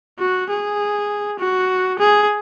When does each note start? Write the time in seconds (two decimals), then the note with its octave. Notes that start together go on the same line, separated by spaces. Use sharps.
0.19 F#4
0.50 G#4
1.39 F#4
1.99 G#4